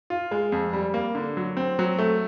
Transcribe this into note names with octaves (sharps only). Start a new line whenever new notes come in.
F4
G#3
F2
G3
A#3
D3
F#3
C4
F#3
A3